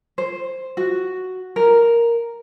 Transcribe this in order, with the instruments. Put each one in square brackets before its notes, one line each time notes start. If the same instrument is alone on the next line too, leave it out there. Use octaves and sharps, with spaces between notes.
[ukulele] C5
F#4
A#4